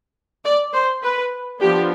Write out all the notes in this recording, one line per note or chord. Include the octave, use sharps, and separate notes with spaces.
D5
C5
B4
F3 B3 D4 G4